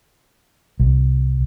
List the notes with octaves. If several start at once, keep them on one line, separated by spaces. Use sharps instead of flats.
C2